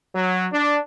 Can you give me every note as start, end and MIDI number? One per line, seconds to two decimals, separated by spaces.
0.15 0.46 54
0.52 0.79 62